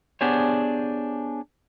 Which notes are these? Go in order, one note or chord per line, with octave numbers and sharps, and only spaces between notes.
B3 D4 G4 G#4 C5 C#5